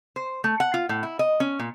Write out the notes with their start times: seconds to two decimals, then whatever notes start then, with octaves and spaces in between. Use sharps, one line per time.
0.16 C5
0.44 A3
0.60 F#5
0.74 F4
0.89 A2
1.03 E4
1.19 D#5
1.40 C#4
1.60 A#2